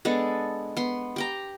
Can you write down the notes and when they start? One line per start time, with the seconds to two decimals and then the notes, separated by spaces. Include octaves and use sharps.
0.05 G#3 B3 D4 A4
0.77 B3 C6
1.16 G4 G5 A#5